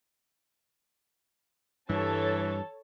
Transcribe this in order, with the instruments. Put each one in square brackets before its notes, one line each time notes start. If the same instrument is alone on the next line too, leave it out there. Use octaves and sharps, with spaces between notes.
[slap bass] G2 G3 [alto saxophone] E3 [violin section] A4 C#5 A5